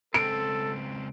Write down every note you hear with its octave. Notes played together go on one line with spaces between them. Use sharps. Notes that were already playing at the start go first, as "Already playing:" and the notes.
C#2 C4 A4 D7